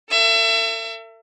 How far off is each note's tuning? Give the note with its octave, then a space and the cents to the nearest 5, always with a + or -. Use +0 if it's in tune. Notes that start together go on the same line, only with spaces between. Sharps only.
A4 +45 E5 +35